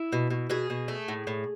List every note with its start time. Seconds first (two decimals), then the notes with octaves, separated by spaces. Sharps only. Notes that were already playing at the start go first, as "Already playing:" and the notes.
Already playing: E4
0.12 B2
0.30 B2
0.50 B2 G#4
0.70 B2
0.88 A3
1.08 A2
1.27 A2